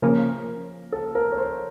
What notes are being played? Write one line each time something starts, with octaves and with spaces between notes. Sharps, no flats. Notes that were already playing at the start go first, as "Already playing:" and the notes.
C#3 F3 A#3 C#4 A#4
A4
A#4
C#5
C5